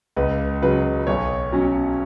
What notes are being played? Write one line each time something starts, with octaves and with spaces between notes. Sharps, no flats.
C#2 B4
C#3 F#3 B4
B1 C#5
B2 F#3 C#4